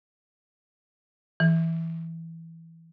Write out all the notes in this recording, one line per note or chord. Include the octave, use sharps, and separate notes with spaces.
E3